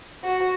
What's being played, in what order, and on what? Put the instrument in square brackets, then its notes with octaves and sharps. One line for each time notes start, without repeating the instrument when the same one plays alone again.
[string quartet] F#4